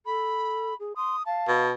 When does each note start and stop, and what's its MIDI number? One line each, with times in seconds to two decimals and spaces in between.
0.06 0.74 69
0.06 0.75 83
0.79 0.93 68
0.96 1.16 84
0.96 1.25 87
1.26 1.63 77
1.26 1.71 81
1.48 1.72 47